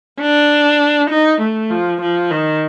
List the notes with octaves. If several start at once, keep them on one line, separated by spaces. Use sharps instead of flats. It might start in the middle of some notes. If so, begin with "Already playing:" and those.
D4
D#4
A3
F3
F3
D#3